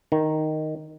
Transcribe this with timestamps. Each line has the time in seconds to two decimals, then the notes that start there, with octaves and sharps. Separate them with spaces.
0.12 D#3